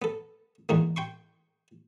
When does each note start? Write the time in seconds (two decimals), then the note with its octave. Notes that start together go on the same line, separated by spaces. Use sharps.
0.02 B3 A4
0.69 E2 G#2 E3 A#3
0.96 G5 C6 C#6